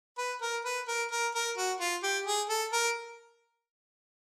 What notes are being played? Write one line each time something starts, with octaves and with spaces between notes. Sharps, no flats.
B4
A#4
B4
A#4
A#4
A#4
F#4
F4
G4
G#4
A4
A#4